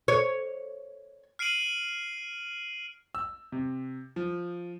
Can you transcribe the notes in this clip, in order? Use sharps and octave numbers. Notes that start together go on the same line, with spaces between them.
C#5
F6 C7 D7 D#7 F#7
E6
C3
F3